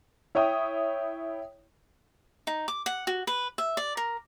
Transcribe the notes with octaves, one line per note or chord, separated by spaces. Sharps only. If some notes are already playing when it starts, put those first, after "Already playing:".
E4 C#5 G5 D#6
D#4
D6
F#5
F#4
B4
E5
D5
A#4